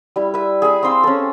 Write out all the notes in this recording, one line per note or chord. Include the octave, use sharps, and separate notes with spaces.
G3 E4
B4 E5
G#4 E5
C4 F5 C6 E6
C#4 A4